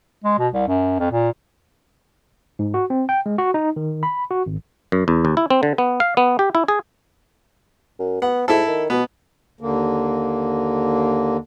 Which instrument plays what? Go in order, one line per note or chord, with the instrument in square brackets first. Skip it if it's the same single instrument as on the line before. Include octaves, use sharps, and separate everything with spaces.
[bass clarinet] G#3
B2
C2
F#2
F2
A#2
[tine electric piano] G#2
F#4
C4
G5
G#3
F#4
D#4
D#3
B5
F#4
G#1
[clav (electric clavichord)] F#2
E2
D#2
E4
C4
D3
B3
F5
B3
G4
E4
G#4
[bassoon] F#2
[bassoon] B3 [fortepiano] F#5
[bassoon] G#2 [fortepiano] E4 A4
[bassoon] D#3
[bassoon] B2 [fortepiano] B3
[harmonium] D#2 D3 A#3